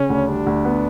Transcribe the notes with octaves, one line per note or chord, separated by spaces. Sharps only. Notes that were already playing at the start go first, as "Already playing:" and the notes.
Already playing: C#3 C#4
D2
G3 D4
D2
B3